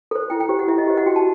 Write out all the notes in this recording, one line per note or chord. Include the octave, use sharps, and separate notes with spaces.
A4 C5
E4 G5
G5
G4 C5
F#5
E4 E5
D#5
G4 C5 E5
F#5
F#4 G5
A5